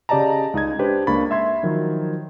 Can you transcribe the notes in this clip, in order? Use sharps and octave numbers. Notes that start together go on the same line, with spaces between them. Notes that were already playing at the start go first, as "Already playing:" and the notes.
C#3 G4 D5 D#5 A5 A#5
C#2 D#4 D#5 G#6
D4 G4 B4 C5
C#2 A#3 D4 B5 C#6 A6
E5 C6 G#6
D#3 F3 F#3